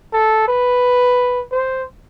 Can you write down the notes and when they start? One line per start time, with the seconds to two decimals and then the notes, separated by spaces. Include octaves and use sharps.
0.13 A4
0.48 B4
1.52 C5